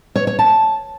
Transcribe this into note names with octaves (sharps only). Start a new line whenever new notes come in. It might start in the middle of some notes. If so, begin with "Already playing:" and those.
C#5
C#5
A5